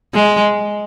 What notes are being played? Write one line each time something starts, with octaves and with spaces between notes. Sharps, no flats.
G#3